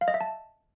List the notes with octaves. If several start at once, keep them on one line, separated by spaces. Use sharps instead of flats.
F5
D#5
E5
A5